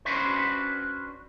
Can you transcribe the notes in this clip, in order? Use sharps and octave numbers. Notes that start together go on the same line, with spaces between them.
C#4 D4 F#4 B4 C5